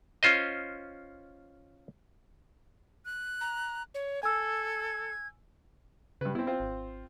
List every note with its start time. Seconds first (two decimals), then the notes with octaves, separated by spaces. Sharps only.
0.23 C#4 F4 C5 D#5
3.05 F#6
3.41 A#5
3.95 C#5
4.23 A4 G#5 E6 G#6
6.21 G2 C#3 B4
6.35 B3 C4 E4
6.47 C4 F4 C5
6.60 G#1